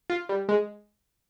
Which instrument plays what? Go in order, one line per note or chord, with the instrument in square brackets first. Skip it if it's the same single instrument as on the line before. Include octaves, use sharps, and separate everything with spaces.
[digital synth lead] F4
G3
G#3